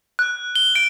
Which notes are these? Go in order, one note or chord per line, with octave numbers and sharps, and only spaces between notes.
F#6
G7
D7